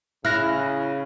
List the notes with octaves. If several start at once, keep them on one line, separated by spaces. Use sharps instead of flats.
C#3 E4 F6 F#6 A#6